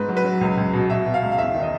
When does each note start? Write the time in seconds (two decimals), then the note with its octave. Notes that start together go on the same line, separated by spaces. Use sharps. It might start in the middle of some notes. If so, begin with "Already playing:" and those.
Already playing: G#2 B4
0.08 F#3
0.17 B4
0.24 F#3
0.41 C#2
0.57 C#2
0.73 B2
0.90 B2 E5
1.06 B2
1.14 F5
1.22 C#2
1.32 F5
1.38 E2 E5
1.54 D#3
1.63 D#5